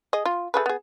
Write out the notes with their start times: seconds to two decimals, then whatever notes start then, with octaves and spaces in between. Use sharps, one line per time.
0.13 G#4 D#5
0.25 F4
0.54 A3 G#4 B4
0.66 B3 G#4